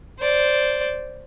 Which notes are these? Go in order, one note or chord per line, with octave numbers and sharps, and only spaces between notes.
C5 D5